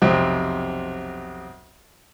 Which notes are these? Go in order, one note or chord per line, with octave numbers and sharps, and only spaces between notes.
B1 F2 C3